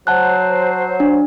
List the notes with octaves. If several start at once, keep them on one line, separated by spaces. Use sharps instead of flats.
F#3 C5 F#5 A5 F#6
D4